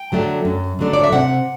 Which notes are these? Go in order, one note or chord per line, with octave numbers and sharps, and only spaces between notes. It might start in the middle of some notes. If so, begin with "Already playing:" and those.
Already playing: G5
D3 F#3 A3 D4
F#2
D3 F#3 A3 D4
D5
E5
C3 F#5